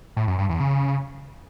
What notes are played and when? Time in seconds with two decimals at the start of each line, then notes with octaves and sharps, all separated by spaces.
0.17 A2
0.27 F#2
0.38 G2
0.49 E2
0.60 C#3